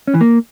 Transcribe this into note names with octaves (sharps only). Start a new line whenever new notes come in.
C#4
E3
A#3